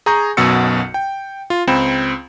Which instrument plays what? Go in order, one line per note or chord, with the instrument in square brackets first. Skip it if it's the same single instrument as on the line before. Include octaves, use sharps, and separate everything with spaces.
[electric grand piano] G#4 G#5 A#5 C#6 G6
B1 F#2 B2 F#4 E6 C#7
G5
F4
C#2 C4 B5 E7